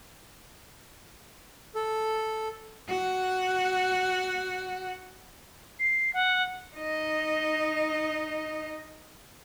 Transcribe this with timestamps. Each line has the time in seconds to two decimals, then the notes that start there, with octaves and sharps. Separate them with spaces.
1.75 A4
2.88 F#4 F#5
5.80 C7
6.14 F#5
6.76 D#4 D#5